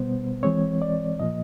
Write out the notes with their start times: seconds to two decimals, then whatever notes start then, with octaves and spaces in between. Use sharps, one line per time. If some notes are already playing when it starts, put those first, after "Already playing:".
Already playing: B2 G3 B3 C5
0.43 E3 G#3 C4 C#5
0.82 D5
1.20 A#2 F3 A#3 D#5